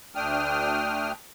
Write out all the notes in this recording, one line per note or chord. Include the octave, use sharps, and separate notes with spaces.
D2 A3 D4 G5 D#6 F6